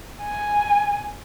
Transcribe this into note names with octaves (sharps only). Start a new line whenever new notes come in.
G#5